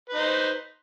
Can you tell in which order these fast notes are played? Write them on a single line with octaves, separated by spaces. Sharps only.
B4 D#4 C5